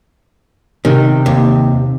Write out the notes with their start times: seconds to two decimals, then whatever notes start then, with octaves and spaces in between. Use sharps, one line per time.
0.85 C3 D#3
1.26 D#2